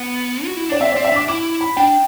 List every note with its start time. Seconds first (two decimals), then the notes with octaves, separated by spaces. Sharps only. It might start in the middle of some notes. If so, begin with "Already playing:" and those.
Already playing: B3 F#5
0.45 F#4
0.57 E4
0.69 D4 D5
0.80 C4 E5
0.92 C4 D5
1.05 E5
1.12 D4 D6
1.28 E4 D6
1.61 B5
1.77 D4 G5